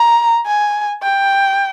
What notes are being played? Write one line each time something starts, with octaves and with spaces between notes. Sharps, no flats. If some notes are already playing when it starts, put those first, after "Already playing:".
Already playing: A#5
G#5
G5